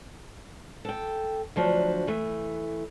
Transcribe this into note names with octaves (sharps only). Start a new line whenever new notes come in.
A4 G5
D2 F3 F#3 D4
E3 A3